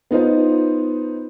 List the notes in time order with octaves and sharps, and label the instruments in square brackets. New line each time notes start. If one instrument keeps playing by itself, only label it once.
[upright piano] B3 D#4 F4 C5